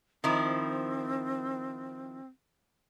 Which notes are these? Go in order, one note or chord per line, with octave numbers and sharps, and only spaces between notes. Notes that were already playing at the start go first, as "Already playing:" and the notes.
D#3 F3 C4 E4